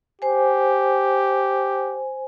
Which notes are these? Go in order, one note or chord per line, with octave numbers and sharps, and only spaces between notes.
G4 C5 G#5